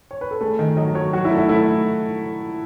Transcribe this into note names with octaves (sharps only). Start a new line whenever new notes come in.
C#5
B4
A4
A3 G#4
D#3
F#3 D#5
F#3 C#5
F#3 F#4
E4
A3
E4
A3 E4